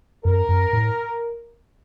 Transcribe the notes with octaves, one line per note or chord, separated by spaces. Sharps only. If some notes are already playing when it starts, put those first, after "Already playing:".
F#2 A#4
F#2
A2